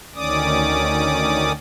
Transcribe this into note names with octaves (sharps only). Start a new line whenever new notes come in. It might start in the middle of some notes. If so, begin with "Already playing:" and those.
D2 D#3 C#4 D5 D6 D#6